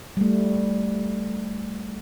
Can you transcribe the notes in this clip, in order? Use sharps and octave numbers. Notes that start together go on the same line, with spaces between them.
G3 A3